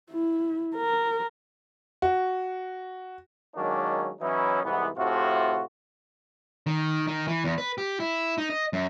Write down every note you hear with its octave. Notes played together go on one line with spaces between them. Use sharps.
E4
A#4
F#4
D#3 F#3 G#3 A#3 C#4 D4
E3 F#3 C#4 D#4 E4
C2 G#2 E3 B3
A2 C3 A3 F4 F#4
D#3
D#3
E3
E2
B4
G4
E4
D#4
D#5
F#2